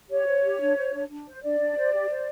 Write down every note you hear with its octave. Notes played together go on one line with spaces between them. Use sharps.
G4 C#5
C5
G4
D4
C5
D4
D4
C5
D4 D5
D4
C5
G4
C5